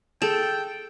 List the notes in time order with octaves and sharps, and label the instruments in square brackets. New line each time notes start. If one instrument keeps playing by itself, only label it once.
[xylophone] G#4 E7 [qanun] A4 [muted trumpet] G5